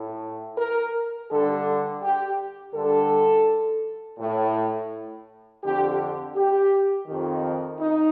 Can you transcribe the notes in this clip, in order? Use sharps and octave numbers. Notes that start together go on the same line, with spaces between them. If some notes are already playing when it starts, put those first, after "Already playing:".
Already playing: A2
A#4
G2 D3 A4
G4
G2 D3 A4
A2
F2 D3 G4
G4
F2 D#3
D#4